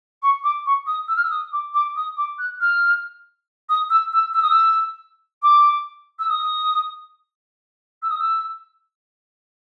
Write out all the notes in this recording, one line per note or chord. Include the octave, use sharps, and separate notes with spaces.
C#6
D6
C#6
D#6
E6
F6
E6
D#6
D6
D6
D#6
D6
F#6
F6
D#6
E6
E6
E6
D#6
E6
D6
E6
D#6
E6
D#6
E6